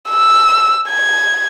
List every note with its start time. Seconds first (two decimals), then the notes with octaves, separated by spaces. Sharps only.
0.10 E6
0.90 G#6